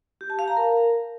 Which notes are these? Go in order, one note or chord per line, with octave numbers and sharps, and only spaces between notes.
G4
A5
F5
A#5
A#4